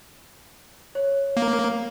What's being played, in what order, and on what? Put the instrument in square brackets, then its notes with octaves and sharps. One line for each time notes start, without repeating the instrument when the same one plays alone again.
[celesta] C#5
[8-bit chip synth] A#3